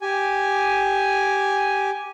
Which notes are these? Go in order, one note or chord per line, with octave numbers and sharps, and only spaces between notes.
G4 G#5